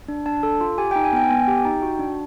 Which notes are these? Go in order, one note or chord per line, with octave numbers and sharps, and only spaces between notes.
D4
D4 A5
A4
F4
G4 G#5
G5
D#4
G#5
B3 G5
B3 G#5
G5
G4
D#4
F#4
D4